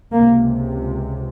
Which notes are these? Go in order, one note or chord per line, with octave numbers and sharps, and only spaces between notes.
C#2 C3 A#3